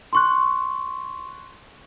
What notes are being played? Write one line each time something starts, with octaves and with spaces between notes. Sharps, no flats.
C6 C#6 F#6